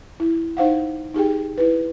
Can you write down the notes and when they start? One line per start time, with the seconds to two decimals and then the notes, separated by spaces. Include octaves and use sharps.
0.20 E4
0.57 D#4 C5 F5 F#5
1.14 D#4 G4 G#4 G5
1.58 E4 B4